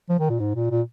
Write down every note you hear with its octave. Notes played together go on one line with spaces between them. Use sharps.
F3
D#3
A#2
G#2
A#2
A#2